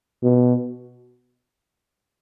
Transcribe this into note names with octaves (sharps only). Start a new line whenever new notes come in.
B2